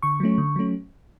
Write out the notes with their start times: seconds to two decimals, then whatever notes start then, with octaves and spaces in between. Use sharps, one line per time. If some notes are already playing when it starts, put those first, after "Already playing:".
0.02 D3 C#6
0.20 F#3 A3 C#4
0.38 D3
0.56 F#3 A3 C#4